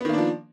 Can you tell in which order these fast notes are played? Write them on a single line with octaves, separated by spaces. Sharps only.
B3 D#3 A#3 D4 F3